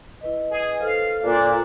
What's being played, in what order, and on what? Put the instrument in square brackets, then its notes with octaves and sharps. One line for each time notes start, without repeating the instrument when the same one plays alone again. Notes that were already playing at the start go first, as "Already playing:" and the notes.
[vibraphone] E4 B4 D#5
[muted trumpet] G#4
[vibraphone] A4 C5 [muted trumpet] F5
[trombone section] A#2 [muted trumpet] D4